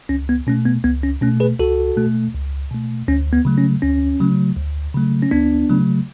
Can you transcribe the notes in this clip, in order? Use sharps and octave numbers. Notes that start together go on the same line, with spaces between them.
C#2 C#4
B3
B2 A3 C#4
B3
C#2 B3
C#4
B2 A3 C#4
G#4 B4
C#2 F#4 A4
B2 A3
C#2
B2 A3
D2 C#4
B3
C#3 F#3 A3
C#4
D2 C#4
C#3 F#3 A3
D2
C#3 F#3 A3
C#4
D2 B3 D4
C#3 F#3 A3